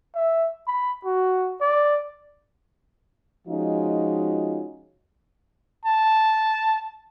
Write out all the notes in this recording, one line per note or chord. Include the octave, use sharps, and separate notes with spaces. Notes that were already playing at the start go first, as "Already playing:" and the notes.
E5
B5
F#4
D5
F3 G#3 C#4 D#4 F4 F#4
A5